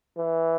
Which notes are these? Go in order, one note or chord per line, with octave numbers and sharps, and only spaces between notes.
E3